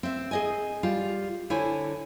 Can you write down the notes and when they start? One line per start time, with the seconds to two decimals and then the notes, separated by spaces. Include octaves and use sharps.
0.03 C4 E5
0.31 G#4 D#5 G#5
0.83 G3 F4
1.50 D3 E4 C5 C#5 G#5